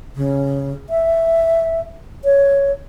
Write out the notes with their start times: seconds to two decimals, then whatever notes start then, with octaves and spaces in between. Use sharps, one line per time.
0.16 C#3
0.90 E5
2.24 C#5